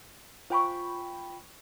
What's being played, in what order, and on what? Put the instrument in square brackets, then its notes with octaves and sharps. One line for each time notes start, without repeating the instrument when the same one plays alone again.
[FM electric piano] F4 G5 B5 [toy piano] C5 G#5 C#6